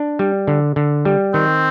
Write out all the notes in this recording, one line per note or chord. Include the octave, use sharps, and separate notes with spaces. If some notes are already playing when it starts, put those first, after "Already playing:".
Already playing: D4
G3
D3
D3
G3
D#3 C4